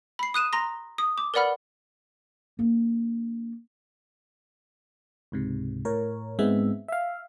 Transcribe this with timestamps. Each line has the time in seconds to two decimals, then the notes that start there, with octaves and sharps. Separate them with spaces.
0.19 B5 C7
0.34 D#6 F#6 D#7 E7
0.53 A#5 C6 A#6
0.98 D#6
1.18 D6
1.34 A#4 B4 D5 F#5 B5 F6
2.59 A#3 D4
5.32 C#2 G#2 C3
5.85 A2 A#4 C#5
6.39 G#2 G#3 B3 C4 E5
6.88 E5 F5